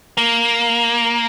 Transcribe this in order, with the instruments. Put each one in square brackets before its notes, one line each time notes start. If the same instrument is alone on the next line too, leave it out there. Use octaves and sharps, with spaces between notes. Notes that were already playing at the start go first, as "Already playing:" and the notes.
[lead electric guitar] A#3